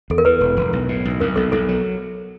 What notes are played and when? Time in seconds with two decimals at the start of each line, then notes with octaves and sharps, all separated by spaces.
0.10 E2 A4
0.18 A#4
0.25 E3 B4
0.41 E1
0.57 E1
0.73 B1
0.89 A2
1.05 B1
1.20 B1 A#4
1.36 B1 A4
1.52 B1 A4
1.68 F#3